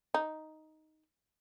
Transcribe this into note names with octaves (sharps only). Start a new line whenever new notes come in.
D#4